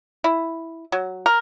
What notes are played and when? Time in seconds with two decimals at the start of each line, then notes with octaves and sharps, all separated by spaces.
0.24 E4
0.92 F#3
1.26 A#4